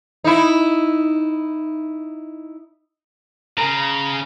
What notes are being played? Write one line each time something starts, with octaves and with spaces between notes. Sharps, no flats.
D#4 E4
C#3 A#5